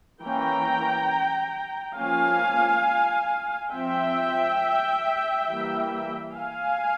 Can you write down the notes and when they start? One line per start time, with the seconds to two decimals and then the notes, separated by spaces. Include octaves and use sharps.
0.22 E3 A#3 C#4 G5 A#5
1.97 F3 A#3 C#4 F5 G#5
3.72 F3 C4 E5 G5
5.47 E3 G3 A#3
6.35 F5 G#5